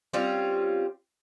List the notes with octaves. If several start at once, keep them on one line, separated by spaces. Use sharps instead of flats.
G3 C4 C#4 F4